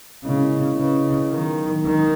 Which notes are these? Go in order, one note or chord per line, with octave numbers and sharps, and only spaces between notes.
C#3 G#3 B3 E4 A#4 D#5
C#3 E4 B4 D#5
D#3 F#3 B3 D#4 A#4
D#3 G#3 D#4 A#4